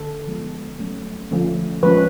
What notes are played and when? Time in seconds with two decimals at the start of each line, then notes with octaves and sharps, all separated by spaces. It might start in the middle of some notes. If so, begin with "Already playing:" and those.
Already playing: D3 A4
0.27 F3 G#3 B3
0.79 F#3 A3 C#4
1.31 D3 F3 A3 C#4
1.83 F3 G#3 C#4 B4